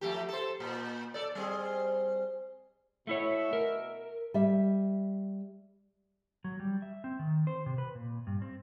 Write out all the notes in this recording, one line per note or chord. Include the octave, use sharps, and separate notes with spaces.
F2 A3 G4
A4 C5
A#2
A4 D5
G3 C4 G#4
B2 A3 E4 C#5 E5
A#4
G3 E5
F#3
G3
E5
C4
D#3
C5
C3
B4
A#2
G2
C4